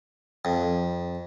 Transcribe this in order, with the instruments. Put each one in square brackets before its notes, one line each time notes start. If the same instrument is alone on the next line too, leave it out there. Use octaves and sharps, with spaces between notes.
[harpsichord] F2